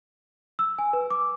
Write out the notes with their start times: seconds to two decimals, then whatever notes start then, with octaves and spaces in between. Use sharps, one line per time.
0.59 E6
0.78 G#5
0.93 B4
1.10 D6